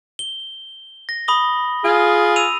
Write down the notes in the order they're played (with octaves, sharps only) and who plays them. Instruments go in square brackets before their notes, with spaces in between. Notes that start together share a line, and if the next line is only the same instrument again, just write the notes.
[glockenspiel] G7
A#6
B5 D#6 G7
[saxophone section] F4 G#4
[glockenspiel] E6 D#7 F7